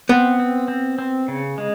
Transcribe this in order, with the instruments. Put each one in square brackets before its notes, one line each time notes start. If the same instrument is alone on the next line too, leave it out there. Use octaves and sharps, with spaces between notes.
[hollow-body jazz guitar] B3 [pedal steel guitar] C4
[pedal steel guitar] C4
C4
C4
C#3
G#3